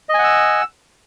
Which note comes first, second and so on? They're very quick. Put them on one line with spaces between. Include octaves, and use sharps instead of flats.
D#5 G#5 F#5 E6